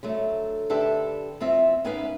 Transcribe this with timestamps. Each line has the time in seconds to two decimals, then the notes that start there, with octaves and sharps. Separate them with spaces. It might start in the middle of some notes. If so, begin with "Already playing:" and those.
0.03 D3 F#3 A3
0.70 D3 D4 G4 A4 B4 E5
1.40 E2 C4 F4 E5
1.85 G#2 B3 C#4 B4 E5 F5